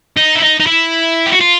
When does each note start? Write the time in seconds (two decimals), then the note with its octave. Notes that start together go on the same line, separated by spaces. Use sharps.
0.17 D#4
0.35 E4
0.42 D#4
0.60 D#4
0.67 E4
1.26 G4
1.33 F#4
1.41 F4